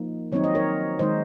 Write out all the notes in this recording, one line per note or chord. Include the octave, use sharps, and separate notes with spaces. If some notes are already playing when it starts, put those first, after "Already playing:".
Already playing: F3 A#3 D#4
D#3 F#3 C4 D#4 C#5
D#5
A#4 C#5
D#3 G#3 D#4 C5 D#5